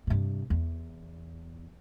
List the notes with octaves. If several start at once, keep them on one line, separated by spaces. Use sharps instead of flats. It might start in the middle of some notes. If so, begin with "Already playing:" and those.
G2 C3
E2